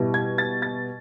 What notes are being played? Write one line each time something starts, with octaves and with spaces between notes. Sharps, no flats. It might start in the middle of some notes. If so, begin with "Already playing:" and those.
Already playing: B2 G3 B3 E4
G#6
A6
A6